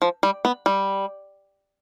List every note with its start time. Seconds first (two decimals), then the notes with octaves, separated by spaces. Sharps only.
0.02 F3
0.23 G3
0.45 B3
0.66 G3